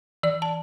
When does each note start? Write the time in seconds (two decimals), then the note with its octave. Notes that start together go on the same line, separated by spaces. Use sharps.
0.23 E3 D5
0.42 A5